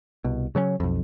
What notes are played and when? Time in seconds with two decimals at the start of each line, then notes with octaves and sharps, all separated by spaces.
0.24 C2 B2
0.55 C#3 F#3 A3 C#4
0.80 B1 F2